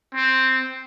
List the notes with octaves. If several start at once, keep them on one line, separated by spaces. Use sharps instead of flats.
C4